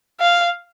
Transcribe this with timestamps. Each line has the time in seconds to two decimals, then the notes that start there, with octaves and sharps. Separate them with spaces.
0.20 F5